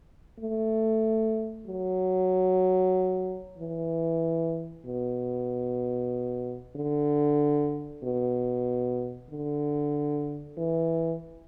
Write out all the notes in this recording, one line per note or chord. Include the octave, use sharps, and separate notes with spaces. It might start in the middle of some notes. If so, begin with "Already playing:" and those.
A3
F#3
E3
B2
D3
B2
D3
E3